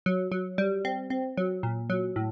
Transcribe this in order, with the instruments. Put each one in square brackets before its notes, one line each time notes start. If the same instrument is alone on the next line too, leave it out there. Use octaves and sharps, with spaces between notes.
[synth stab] F#3
F#3
G3
C4
C4
F#3
A#2
F#3
A2